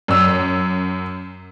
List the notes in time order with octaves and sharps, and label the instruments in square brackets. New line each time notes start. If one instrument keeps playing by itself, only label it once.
[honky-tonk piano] F#2 E6